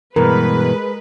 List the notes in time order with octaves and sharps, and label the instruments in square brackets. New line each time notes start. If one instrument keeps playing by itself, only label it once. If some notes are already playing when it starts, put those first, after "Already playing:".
[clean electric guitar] G2 B2 E3 [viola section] G#3 B4 [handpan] A#4